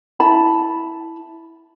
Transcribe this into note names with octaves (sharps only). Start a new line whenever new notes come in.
E4 A5 B5